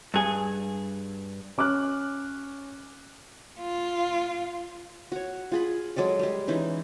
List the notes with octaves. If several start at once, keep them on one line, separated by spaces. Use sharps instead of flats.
G2 G#4
C#4 D6 F6 F#6
F4
F#4 C#5
F4 G#4 B5
F#3 G#3 A4 D5
G3 G#3
E3 C#4 D#4 E4